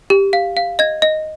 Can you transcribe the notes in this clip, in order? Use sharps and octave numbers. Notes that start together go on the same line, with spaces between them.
G4
F5
F5
D#5 G#6
D#5